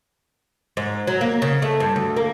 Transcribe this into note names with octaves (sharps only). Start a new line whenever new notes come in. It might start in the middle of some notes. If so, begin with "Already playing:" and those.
G#2
F#3
A#3
C#3
A3
G2
D2
A#3